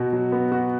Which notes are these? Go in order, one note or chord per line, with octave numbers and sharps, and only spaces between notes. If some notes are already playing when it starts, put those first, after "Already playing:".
Already playing: B2 F#4
F#3
B3
F#4